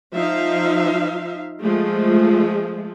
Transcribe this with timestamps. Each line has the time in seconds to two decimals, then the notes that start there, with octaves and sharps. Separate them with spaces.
0.14 F3 D#4 E5 F5
1.62 F3 G#3 A3